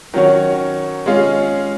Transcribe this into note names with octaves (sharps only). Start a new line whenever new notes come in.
D#3 F#3 C#4 F#4 C#5
G#3 C#4 F4 G#4